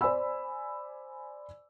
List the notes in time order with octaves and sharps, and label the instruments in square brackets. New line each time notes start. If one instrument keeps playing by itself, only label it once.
[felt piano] C5 D5 G#5 B5 E6